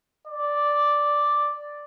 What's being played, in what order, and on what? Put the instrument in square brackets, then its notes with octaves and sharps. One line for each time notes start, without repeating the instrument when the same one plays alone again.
[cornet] D5